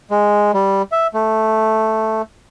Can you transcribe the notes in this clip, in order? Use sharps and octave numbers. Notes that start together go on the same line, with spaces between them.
G#3
G3
E5
A3